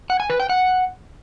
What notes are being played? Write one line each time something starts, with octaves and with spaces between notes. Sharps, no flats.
F#5
G#5
B4
G5
F#5